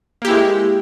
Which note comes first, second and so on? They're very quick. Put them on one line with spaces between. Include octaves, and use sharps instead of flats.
A#3 G4 E4 G#3